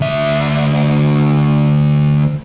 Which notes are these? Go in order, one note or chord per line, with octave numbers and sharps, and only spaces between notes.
D2 E5